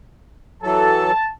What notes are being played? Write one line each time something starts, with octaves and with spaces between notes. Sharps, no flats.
E3 F#3 A4 A5